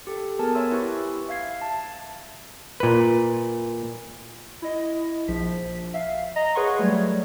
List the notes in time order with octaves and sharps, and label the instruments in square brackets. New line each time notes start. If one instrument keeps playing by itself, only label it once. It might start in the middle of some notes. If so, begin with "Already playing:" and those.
[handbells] G4 A4
B3 G#4 A#4 G#5 A5
C#5 E5 G#5 C6 E6
E4 G4 B4 C#6
E5 F5 G#6 C7
A5
[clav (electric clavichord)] A#2 B4
[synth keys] E4 D#5
A#1 F3 B6
E5 F5
D#5 A#5 A#6
G#4 B4 C#5 F#5 C6 C#6
F#3 G3 A3 C#5